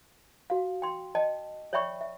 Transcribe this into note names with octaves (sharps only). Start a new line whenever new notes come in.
F#4 F5
G5 C6
D#5 G5 A5
C#5 D5 E5 G5 B5 C#6
E5